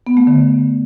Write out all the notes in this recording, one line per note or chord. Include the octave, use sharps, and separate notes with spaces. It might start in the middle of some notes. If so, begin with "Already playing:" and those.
B3
A3
D3